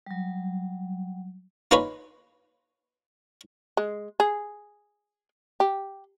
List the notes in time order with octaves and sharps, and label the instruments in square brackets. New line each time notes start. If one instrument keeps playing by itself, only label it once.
[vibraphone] F#3 G3
[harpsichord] D#4 F4 B4 C#5 G#5 B5
[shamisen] G#3
G#4
G4